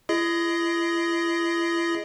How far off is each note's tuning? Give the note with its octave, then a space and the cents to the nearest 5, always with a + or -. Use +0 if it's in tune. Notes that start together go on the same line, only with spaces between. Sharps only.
E4 +40 G#4 +0 D#5 +0